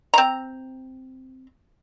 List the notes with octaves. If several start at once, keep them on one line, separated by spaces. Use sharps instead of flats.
C4 A#5